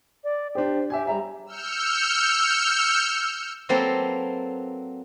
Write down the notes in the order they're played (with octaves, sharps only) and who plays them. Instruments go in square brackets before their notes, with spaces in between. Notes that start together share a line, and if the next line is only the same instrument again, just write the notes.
[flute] D5
[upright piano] D4 G4 [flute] C5
[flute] G4 [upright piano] E5 G#5
[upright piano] G3 E5 [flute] A#5
[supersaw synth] E6 F6 G6 C#7
[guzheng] F#3 A#3 C4 A4 B4